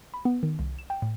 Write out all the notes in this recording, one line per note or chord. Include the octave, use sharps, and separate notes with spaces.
B5
B3
D#3
C2
E7
G5
A2